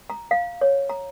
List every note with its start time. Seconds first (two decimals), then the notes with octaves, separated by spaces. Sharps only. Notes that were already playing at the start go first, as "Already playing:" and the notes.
0.10 A#5
0.31 F5
0.61 C#5
0.89 A#5